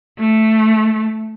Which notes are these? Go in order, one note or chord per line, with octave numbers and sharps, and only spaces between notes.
A3